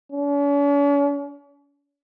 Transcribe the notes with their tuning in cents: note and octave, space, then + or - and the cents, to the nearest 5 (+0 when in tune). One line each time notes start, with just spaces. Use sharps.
C#4 +45